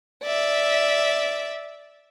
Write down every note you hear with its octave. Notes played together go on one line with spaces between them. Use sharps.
D5 E5